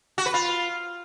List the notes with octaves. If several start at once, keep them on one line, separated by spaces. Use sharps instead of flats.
F#4
B4
F4